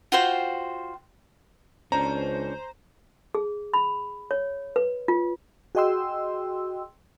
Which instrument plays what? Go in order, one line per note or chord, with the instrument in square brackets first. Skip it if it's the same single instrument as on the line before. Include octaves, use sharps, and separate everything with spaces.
[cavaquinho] F4 F#4 C5 G5
[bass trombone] C#2 [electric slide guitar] C#4 D4 [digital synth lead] C5 [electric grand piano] A#5
[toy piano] G#4
B5
C#5
B4
F4
[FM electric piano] F#4 G#4 D#5 G5 C6 E6